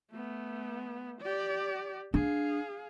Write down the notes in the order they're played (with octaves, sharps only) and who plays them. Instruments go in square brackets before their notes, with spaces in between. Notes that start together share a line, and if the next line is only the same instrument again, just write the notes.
[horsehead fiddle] A3 B3
G4 D5
[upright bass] D4 [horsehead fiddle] G#4 F5